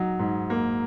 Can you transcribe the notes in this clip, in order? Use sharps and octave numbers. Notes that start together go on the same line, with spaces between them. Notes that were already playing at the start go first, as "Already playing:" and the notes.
Already playing: F#3 D#4
G#2
A#3